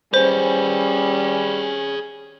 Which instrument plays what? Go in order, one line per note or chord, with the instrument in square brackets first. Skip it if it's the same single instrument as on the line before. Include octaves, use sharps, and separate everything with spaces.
[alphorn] G3 [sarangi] C#4 [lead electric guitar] G#4 B4 [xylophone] C5